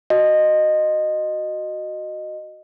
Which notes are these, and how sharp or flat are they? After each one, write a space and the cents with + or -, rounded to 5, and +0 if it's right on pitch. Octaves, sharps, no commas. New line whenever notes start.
F#4 +0 D#5 -15